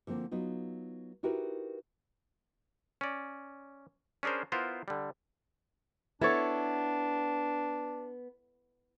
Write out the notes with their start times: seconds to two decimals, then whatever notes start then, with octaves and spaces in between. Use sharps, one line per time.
0.07 D3 F3 A#3 C4
0.31 F#3 B3 D#4 F4
1.23 D#4 E4 F#4 G4 A#4 B4
3.01 C#4 D5
4.23 C#4 D4 G#4 A#4 C5
4.52 B3 E4 F4 A#4 C5
4.88 D3 G3
6.21 B3 D4 E4 A4 C#5